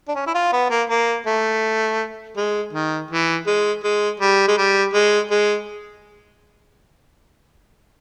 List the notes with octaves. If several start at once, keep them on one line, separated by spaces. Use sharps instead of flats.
D4
C#4
E4
F4
B3
A#3
A#3
A3
G#3
D#3
E3
G#3
G#3
G3
G#3
G3
G#3
G#3